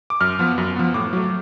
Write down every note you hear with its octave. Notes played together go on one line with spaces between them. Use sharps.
D6
F#2 F6
F3 B3
F#2
F3 B3
A2 D6
F#3 A3